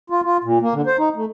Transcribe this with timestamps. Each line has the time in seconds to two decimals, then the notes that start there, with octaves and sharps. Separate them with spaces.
0.10 F4
0.25 F4
0.44 A#2
0.62 A#3
0.74 D3
0.87 C5
0.99 D#4
1.16 A3